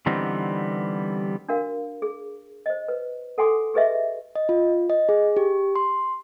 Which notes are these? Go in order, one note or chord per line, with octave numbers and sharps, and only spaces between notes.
D3 E3 G3 B3 C4 D#4
D4 F#4 A#4 F5
G#4
C5 D#5
B4
A4 F#5 G#5 C6 D6
G4 G#4 B4 D#5 E5
D#5
F4
D#5
G#4
G4
C6